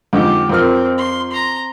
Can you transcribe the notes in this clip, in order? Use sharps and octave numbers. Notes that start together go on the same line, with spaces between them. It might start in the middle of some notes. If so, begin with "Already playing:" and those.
F2 G#2 D3 G4
F2 C4 A#4 F6
C6
A#5 C6